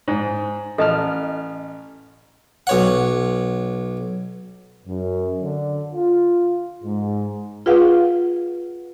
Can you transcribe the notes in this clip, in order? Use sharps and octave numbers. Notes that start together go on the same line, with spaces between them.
G#2
A1 A4 D#5 A5 F6
B1 C#5 F#5
F#2
D3
F4
G#2
F4 G#4 B4 F5 F#5